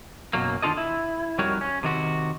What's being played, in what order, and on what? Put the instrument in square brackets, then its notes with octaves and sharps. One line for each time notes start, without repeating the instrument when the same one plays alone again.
[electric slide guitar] F#2 B2 F#3 A#3
D#3 G3 D4 F4 A4 D#5
E4
F2 G3 D#4 F#4 A#4 C#5
C#4
C3 D#3 F#4